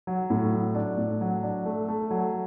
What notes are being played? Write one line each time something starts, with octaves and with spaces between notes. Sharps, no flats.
F#3
A2
F#3
D4
A2
F#3
D4
A3
A3
F#3